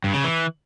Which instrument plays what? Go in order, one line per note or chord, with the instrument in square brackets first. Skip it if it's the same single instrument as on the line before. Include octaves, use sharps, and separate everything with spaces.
[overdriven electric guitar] G2
C#3
E3